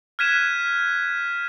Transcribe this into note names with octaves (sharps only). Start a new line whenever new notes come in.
F6 F#6 G#6 B6 D#7 E7